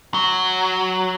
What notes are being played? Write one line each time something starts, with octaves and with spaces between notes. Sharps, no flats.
F#3